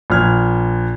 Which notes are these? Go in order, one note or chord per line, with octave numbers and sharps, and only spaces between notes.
A#1 F6 G#6